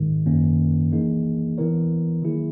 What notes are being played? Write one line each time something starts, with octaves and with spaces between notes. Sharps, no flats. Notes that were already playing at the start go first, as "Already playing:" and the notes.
Already playing: G#2 D#3 G#3
F#2 D#3 A#3 C#4
E3 A#3 D#4 G#4
E3 B3 E4 A#4 C#5
D#3 F#3 A#3 E4 G#4